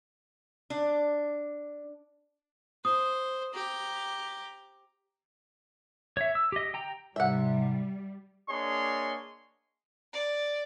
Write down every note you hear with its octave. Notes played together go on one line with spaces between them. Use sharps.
D4
C5 D#6
G4 A#5
C#5 E5
E6
G4 D#5
G5 A#5
G#2 C3 G3 E5 F#5
A#3 D4 G#4 C#5 D#5 C6
D5